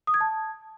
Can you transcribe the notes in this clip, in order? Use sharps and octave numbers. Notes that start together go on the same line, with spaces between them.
D#6
G#6
A5